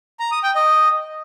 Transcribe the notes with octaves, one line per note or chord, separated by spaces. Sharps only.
A#5
D#6
G5
D#5